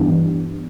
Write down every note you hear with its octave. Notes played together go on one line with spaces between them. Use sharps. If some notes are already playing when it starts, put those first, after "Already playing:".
Already playing: G2 E3 B3 D4 G4